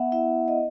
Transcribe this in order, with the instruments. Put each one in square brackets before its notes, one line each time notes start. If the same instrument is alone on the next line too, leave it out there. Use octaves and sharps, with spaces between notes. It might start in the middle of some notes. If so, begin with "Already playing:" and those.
Already playing: [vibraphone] B3 E5 F#5
E4 E5
D#5